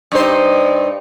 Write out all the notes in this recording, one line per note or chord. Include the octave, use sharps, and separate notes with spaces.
G2 D#4 C5